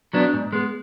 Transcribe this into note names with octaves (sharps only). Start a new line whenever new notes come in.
F#3 B3 D4
G#2
G#3 B3